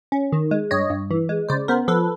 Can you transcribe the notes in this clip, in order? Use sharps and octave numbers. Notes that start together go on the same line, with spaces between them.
C#4
D#3
G#3
G2 C#5 D#5
G2
E3
G#3
C#3 C5 D5
B3 A#4 C5
F3 A4 B4